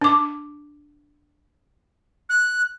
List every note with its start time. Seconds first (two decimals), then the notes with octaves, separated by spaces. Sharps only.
0.01 D4 D6
2.29 F#6